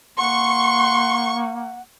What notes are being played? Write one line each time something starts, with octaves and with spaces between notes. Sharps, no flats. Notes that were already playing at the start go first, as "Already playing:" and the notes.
A#3 F#5 C6 C#6